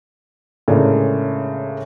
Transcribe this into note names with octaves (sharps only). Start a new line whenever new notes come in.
A2 C#3 G#3 A#3 D4